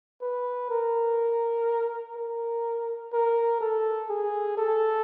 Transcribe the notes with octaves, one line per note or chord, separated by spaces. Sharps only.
B4
A#4
A#4
A#4
A4
G#4
A4